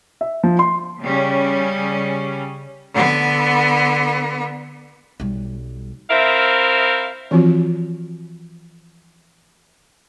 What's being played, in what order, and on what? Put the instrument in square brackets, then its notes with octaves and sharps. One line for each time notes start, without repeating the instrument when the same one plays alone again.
[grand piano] E5
F3
C6
[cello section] C#3 G3 C#4
[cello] D3 B3
[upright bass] B1 G3
[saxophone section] C4 E4 A#4 E5 F5
[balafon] E3 F3 C4 F4 F#4